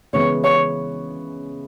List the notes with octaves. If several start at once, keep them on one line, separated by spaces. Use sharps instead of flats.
C#3 E3 G#3 B3 C#5
C#5